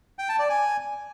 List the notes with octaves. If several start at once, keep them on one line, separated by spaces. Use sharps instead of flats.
G5
A5
D5
G#5